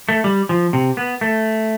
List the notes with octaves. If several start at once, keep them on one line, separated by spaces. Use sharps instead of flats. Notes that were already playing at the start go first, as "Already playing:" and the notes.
A3
G3
F3
C3
B3
A3